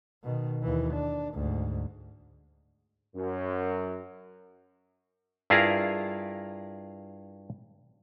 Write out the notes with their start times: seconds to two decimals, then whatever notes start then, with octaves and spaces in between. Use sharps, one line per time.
0.24 B2 D#3
0.63 D#2 E3
0.94 D4
1.34 D2 G#2
3.16 F#2
5.50 G2 E4 F4 G#4 A#4 A#5